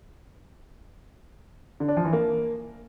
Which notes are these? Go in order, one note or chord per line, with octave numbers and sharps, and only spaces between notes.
D3
D4
F3
E3
A#3